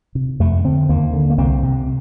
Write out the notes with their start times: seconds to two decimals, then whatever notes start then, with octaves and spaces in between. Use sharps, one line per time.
0.15 C3
0.40 F2 A3
0.65 D3 C4
0.89 D#2 A#3
1.13 D3
1.30 A#3
1.38 C2 C4
1.63 C3